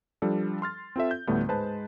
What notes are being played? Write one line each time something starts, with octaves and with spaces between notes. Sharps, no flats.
F3 G3 D4 A4
C6 F6 A6
C4 F4 A4 E5
G6
D2 A2 D3 G3 A3 B3
G#2 G#3 B4 C5 A5